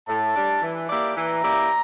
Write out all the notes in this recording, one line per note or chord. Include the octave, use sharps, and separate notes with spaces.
A2 A5
G3 D4
E3
A#3 E4 G4 D5
E3 A#5
A#3 E4 G4 D5